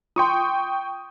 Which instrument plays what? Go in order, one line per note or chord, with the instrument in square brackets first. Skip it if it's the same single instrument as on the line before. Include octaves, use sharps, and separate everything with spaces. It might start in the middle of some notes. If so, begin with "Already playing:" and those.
[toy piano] F4 C6 [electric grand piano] G5 C#6 D#6